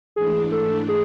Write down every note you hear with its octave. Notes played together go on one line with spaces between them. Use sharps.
G#2 E3 A3 D4 G#4
A4
G#4